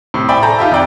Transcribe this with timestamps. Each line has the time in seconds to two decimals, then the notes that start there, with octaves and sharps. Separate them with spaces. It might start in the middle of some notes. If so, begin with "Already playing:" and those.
0.14 A2 C3
0.28 C5 D5 E5 G5 G#5 B5
0.42 A4 A#5 G6
0.59 D#4 F4 G4 E5
0.72 F2 D5 G5